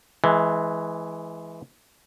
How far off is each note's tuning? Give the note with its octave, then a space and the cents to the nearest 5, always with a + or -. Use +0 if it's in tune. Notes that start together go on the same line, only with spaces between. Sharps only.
E3 +0 G#3 +20